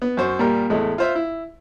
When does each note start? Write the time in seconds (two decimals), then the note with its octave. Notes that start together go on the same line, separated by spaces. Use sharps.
0.02 B3
0.17 F#2 C5 C#6
0.39 A#2 G3 A#4
0.70 E2 A2 G#3 A3
0.98 F4 C5 E5
1.15 E4